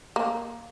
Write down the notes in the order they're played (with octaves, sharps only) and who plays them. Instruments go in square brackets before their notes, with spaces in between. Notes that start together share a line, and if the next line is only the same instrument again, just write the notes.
[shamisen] A#3